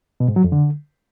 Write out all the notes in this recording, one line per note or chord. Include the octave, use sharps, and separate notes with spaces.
B2
G#2
F#3
F2
D3